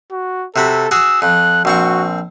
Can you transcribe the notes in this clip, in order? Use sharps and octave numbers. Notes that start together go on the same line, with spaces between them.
F#4
C3 F#4 A4 B5
F#4 G#4 E6
F2 F#6
A#1 C4 F#4 C#6